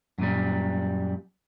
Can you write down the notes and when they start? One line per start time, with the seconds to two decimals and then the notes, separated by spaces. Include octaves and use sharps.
0.18 F#2 A#2 G3